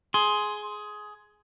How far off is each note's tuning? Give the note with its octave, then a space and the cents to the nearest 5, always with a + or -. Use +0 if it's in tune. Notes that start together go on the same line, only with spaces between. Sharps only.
G#4 +15 C6 +0